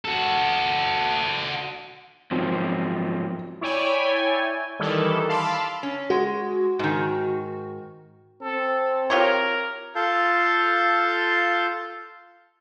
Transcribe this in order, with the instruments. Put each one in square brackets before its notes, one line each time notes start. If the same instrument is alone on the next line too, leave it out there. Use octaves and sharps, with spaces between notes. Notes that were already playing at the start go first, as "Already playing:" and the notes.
[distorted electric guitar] F#4 A4
[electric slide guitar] G#2 F3 F#3 [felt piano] C4
[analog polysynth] E4 C#5 D5 G5 G#5
D#3 E3 G3 E4 A4
F5 A5 B5 C6 D6 E6
[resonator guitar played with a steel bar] C#4
[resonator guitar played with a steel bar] G#3 [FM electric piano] F#4
[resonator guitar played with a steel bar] G#2 D#3
[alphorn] C4 [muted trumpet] A4
[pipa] F4 G4 C#5 [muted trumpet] A#4
[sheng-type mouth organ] F4 A4 F5 A5 G6